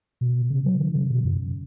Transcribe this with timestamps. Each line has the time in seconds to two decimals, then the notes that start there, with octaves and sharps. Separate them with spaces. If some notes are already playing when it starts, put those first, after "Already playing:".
0.21 B2
0.50 C#3
0.65 F#3
0.80 D#3
0.95 C#3
1.10 B2
1.25 F#2